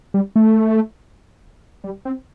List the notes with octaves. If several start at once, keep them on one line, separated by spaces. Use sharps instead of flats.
G3
A3
G3
C4